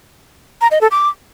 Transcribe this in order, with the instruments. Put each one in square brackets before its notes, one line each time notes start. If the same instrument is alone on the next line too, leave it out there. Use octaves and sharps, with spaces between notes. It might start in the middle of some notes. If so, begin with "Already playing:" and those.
[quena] A#5
D#5
A4
D6